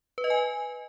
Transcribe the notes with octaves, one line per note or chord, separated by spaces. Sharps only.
B4
D#5
G#5